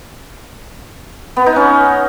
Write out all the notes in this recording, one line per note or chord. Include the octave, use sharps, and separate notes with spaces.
B3
D#4
C#4